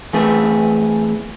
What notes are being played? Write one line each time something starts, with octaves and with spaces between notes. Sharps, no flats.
E3 A3 C4 G#4 A4 B4